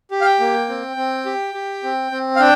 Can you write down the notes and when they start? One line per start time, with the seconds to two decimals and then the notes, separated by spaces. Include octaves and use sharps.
0.11 G4
0.21 F5
0.25 G5
0.40 A#3
0.69 C4
0.97 C4
1.26 G4
1.54 G4
1.83 C4
2.11 C4
2.36 F5
2.40 D4 G5